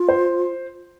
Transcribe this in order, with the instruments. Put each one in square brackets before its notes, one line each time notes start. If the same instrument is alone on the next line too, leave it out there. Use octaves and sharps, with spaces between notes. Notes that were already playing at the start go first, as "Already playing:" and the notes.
Already playing: [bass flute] F4
[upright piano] C5